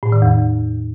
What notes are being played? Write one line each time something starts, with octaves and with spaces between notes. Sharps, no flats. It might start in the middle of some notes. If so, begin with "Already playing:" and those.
A2
D#3
E2